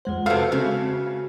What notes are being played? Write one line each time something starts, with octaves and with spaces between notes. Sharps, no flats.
F2 G#3 F4 C5 F#5
C3 A3 F#4 A4 B4 C5 F5
C#3 G#3 C4 F#4